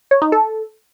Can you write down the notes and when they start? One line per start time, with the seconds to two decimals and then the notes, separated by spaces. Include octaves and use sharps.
0.11 C#5
0.22 D#4
0.32 A4